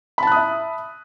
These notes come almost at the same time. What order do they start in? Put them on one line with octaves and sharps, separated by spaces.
B5 A5 F#6 D#6 E5